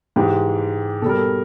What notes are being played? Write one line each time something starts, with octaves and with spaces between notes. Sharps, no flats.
G#2 E3 G#3 G4
B2 G3 A4 A#4
A4